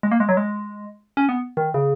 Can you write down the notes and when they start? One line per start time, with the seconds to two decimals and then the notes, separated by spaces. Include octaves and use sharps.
0.03 G#3
0.11 A#3
0.20 G#3
0.29 F#3
0.37 G#3
1.17 C#4
1.29 B3
1.57 D#3
1.74 C#3